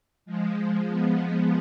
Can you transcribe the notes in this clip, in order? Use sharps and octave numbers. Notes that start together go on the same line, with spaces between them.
F3 G#3
G#3 B3